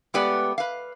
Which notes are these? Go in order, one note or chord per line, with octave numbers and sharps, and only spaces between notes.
G#3 A3 B3 G4 B4 D5
B4 F5